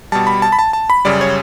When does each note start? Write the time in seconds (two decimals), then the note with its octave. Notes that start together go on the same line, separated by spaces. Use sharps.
0.12 B2 G3 A5
0.27 B5
0.42 A5
0.52 B5
0.59 A5
0.73 A5
0.90 B5
1.05 F#2 C#3 G3 D5
1.21 C#5